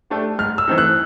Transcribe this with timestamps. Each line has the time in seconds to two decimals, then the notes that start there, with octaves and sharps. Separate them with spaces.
0.10 A3 D4 G4
0.39 G#2 F6
0.58 E6
0.67 E3 A3 C4 D#4
0.78 F#6